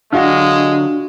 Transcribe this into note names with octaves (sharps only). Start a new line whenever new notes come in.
D3 F#3 G#3 D4 F4 F#4 F6 A#6